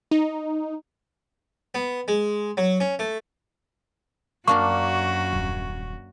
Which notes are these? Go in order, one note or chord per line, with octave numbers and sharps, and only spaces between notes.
D#4
B3
G#3
F#3
C#4
A3
F#2 A#3 D4 F#4 A#4 C#6
D#1